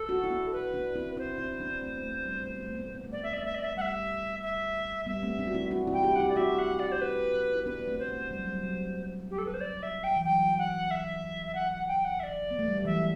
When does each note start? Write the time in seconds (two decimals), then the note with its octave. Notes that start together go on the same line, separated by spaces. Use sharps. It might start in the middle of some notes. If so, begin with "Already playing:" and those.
Already playing: A4
0.09 D4 F#4
0.24 E4
0.30 B3 D4
0.52 B4
0.74 B3 D4
0.95 C4 E4
1.17 C4 E4 C5
1.38 C4 E4
1.60 B3 D4
1.82 A3 C4
1.97 B3
2.04 A3
2.25 G3 B3
2.47 A3
2.57 B3
2.66 A3
2.75 B3
2.85 A3
2.95 B3
3.04 A3
3.12 B3 D5
3.23 A3 E5
3.33 B3 D5
3.43 A3 E5
3.54 D5
3.63 E5
3.76 G3 E5 F#5
4.42 E5
5.06 G3 B3 E5
5.22 A3 C4
5.39 B3 D4
5.47 F#4
5.55 C4 E4
5.71 D4 F#4
5.87 C4 E4
5.93 G5
6.03 E4 G4
6.15 E4 G4 F#5
6.28 D5
6.36 D4 F#4 E5
6.58 F#5
6.79 D5
6.91 C5
7.01 B4
7.54 E4
7.66 B3 D4 B4
7.80 B3
7.87 A3 C4
7.99 C5
8.08 A3
8.31 G3
8.39 F#3
8.48 G3
8.63 F#3
9.30 G4
9.38 A4
9.45 B4
9.53 C5
9.60 D5
9.82 E5
10.03 G5
10.16 E3
10.25 F#3 G5
10.58 F#5
10.90 E5
11.46 E5
11.54 F#5
11.72 F#5
11.87 G5
12.04 F#5
12.19 E5
12.23 D5
12.51 B3
12.59 A3
12.68 G3
12.76 F#3
12.85 E3 E5